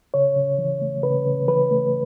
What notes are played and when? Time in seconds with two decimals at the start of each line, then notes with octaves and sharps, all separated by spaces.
0.14 C#3 C#5
0.36 C#3
0.59 E3
0.81 A3
1.03 C#3 B4
1.25 C#3
1.48 E3 B4
1.71 A3